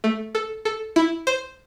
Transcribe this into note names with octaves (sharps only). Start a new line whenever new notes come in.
A3
A4
A4
E4
C5